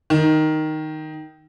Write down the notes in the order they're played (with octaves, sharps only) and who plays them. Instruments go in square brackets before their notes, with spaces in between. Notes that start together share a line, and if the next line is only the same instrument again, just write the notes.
[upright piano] D#3